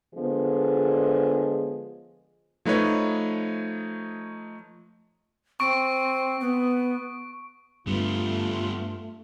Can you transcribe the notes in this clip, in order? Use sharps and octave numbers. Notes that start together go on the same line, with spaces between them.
D3 F3 G#3 B3 G#4
F3 A3 D#4 B4 C#5
C4 C#6 D7
B3
G2 G3 A3 B3 F4